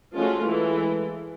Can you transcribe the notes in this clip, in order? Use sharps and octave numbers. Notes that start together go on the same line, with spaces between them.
F3 G#3 A3 C#4 F4 F#4
E3 G#3 A4